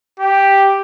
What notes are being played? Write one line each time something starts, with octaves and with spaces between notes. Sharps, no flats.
G4